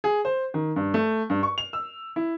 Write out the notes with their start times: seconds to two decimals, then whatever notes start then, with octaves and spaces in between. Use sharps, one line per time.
0.04 G#4
0.25 C5
0.54 D#3
0.76 G2
0.94 A3
1.30 G2
1.43 C#6
1.58 F7
1.73 E6
2.16 E4